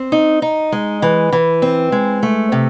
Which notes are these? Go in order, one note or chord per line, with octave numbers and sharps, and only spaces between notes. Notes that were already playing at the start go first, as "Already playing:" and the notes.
Already playing: C4
D#4
D#4
G#3
E3
E3
C4
G#3
A3
C3